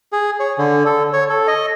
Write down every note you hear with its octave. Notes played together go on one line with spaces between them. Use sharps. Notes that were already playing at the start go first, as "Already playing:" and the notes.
G#4
C#5
D3
A4
C#5
A4
D#5